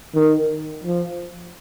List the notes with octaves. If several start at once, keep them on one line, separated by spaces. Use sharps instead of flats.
D#3
F3